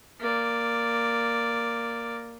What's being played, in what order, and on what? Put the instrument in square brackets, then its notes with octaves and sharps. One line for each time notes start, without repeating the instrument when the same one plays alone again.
[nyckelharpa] A#3 D5